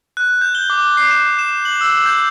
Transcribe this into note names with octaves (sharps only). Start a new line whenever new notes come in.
F#6
G6
G7
D6
C7
E7
E7
F#7
E6
G6